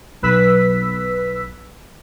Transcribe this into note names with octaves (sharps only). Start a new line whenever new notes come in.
B1 B4 E6 B6